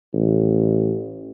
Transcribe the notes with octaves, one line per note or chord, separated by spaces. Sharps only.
A1